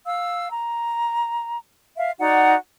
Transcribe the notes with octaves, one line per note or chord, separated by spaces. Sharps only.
F5 E6
A#5
E5 F5
D#4 F#4 D5 F#5